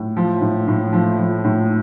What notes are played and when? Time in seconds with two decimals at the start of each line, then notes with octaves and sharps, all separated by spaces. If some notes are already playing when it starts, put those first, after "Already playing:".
Already playing: A2
0.17 F3
0.41 A2
0.68 A2
0.93 F3
1.19 F3
1.45 A2